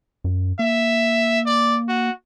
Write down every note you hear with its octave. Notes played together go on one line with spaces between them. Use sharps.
F#2
A#3 E5
D5
F#4